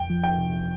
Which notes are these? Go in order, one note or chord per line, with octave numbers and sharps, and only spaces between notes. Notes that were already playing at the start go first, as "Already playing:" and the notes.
Already playing: F2 G5
F3
G5
C3